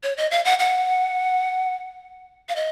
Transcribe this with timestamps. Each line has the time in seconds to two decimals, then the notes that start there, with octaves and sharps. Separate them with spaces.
0.03 C#5
0.17 D#5
0.31 F5
0.45 F#5
0.59 F#5
2.49 F5
2.56 D#5